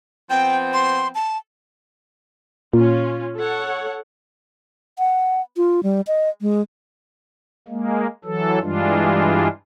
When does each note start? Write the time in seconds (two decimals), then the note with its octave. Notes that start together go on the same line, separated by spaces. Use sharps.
0.30 F3 B3 C4 G5
0.73 C6
1.15 A5
2.73 A#2 C#4 F4
3.37 A4 C#5 F#5
4.99 F#5
5.57 F4
5.83 G3
6.07 D#5
6.41 G#3
7.68 G#3 A#3
8.25 E3 F#3 A4
8.61 G2 E3 G3 G#3 D4 F4